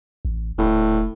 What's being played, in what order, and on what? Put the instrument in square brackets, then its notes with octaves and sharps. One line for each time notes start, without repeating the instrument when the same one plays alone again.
[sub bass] A1
[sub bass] D#1 [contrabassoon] A2